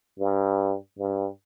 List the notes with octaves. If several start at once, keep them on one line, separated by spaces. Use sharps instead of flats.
G2
G2